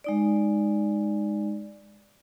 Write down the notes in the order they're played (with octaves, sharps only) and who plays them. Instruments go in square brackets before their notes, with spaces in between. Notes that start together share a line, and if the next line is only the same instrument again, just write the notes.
[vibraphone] G#3 D#4 D5